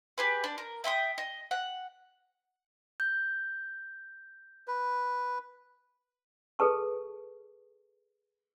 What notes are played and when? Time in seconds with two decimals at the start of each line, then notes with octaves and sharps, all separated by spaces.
0.18 G4 G#4 B4
0.44 D4
0.58 A#4
0.84 E5 G5 B5 D#6
1.18 D#5
1.51 F#5
3.00 G6
4.68 B4
6.59 G#4 A4 B4 A5 C#6